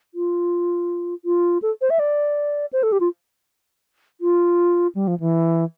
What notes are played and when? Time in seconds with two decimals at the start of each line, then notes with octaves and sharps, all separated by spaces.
0.14 F4
1.25 F4
1.62 A4
1.81 C5
1.90 E5
1.99 D5
2.73 C5
2.83 A4
2.92 G4
3.00 F4
4.21 F4
4.95 G3
5.07 F3
5.20 E3